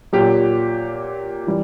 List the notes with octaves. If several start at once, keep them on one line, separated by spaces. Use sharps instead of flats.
A#2 F#3 G4
E3 G3